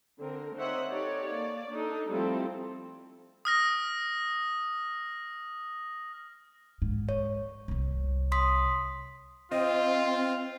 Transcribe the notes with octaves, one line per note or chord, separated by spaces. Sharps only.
D3 C4 A#4
C4 D#4 C5 C#5 E5 F#5
D#4 G4 A4 C#5 D5
A#3 D5
D4 D#4 A4
F3 G3 A3 C4 E4 A4
D#6 F6 A#6
G#2
C#5
C2 C3
C6 D#6 B6
C4 F4 D#5